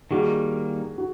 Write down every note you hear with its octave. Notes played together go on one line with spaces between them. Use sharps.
D#3 G3 A#3 F#4 G#4
F#4